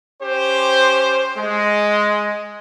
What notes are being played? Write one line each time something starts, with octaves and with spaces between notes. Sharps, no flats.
C#4 G4 C5
G#3